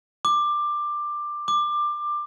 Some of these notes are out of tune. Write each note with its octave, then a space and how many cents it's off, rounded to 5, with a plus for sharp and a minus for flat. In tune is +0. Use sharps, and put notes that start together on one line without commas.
D6 +15
D6 +20